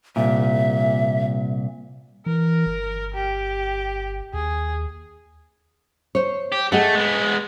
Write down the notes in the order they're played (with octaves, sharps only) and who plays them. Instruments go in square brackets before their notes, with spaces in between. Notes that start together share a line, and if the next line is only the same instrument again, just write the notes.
[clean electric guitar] C2 A#2 [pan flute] E5
[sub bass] E3 [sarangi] A#4
[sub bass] G1
[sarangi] G4
[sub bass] D#2 [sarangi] G#4
[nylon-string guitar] C5 C#5
[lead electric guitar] G4
[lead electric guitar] A3 [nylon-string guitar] G#4 D#5 F#5
[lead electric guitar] G#3 B3